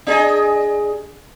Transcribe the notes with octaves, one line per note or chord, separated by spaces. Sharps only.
D4 G#4 D#5